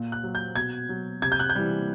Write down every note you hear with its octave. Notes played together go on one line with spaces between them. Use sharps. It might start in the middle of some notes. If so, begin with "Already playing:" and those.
Already playing: A#2
F#6
F#3
G6
B2 G#6
F#3
C3 G#6
G6
F#6
G6
E3 G3